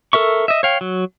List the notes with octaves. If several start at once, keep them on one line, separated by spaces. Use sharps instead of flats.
A4 A#4 E5 C#6
D#5 E5
C#5 F5 G5
F#3